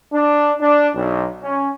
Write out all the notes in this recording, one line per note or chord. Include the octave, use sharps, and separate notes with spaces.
D4
D4
B1
C#4